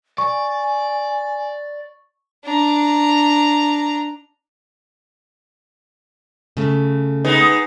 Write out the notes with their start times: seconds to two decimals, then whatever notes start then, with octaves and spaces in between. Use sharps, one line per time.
0.18 D5 G#5 C#6
2.45 D4 A#5
6.57 C#3 A3
7.25 G#3 B3 D#4